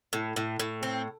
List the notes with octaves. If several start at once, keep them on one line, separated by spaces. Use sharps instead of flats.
A2
A2
A2
C4